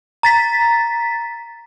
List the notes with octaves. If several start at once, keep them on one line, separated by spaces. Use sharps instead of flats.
A#5 A6 B6